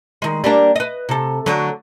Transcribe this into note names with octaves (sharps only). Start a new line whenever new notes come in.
D#3 G#3
G3 A#3 D4
B4 D#5
C3 A4
D3 F#3